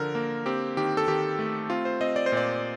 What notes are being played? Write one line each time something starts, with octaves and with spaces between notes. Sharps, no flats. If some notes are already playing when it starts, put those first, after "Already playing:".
Already playing: D3 F3 A#4
A#3
C4 G4
D#3 G4
A4
D#3 G4
A3
C4 F4
C5
C4 D#5
D5
C5
A#2 D5